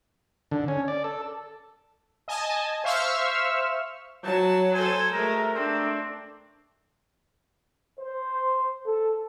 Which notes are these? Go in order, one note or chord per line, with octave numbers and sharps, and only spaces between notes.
D3
C#4
D5
A4
D#5 G#5 A5
C5 E5 F5 C#6 E6 F6
F#3 A5
A4 C5 G#5
G#3 A3 A#4 A#5
A3 C4 D4
C5
A4